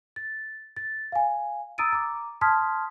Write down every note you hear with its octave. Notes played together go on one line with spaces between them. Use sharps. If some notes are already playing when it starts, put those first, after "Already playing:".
A6
A6
F5 G#5
A#5 D#6 E6 A6 D7 D#7
A#5 D6
A5 C6 D#6 F6 G#6 B6